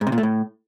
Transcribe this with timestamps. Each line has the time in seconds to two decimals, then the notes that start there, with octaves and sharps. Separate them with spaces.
0.01 G#2
0.07 C3
0.12 A#2
0.18 A3
0.23 A2